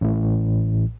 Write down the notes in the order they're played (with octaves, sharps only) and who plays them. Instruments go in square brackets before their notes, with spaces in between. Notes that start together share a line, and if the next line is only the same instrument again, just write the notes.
[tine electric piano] A1 A2